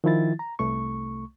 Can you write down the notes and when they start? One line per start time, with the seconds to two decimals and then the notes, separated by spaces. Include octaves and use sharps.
0.04 D#3 F3 E4 A6
0.39 A#5
0.59 C2 A3 C#6